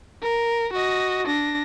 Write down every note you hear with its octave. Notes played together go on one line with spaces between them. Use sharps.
A#4
F#4 D#5
D4 A#6